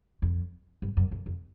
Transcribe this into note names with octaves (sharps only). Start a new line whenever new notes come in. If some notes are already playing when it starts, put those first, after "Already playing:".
F2
G2
F#2
F2
F2